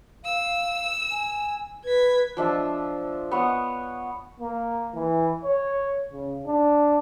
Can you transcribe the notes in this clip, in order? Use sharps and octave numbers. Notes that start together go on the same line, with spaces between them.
F5 E6
G#5
B4 G#6 B6
F3 D4 E5 A5
B3 C#5 F#5 D#6
A#3
E3
C#5
C#3
D4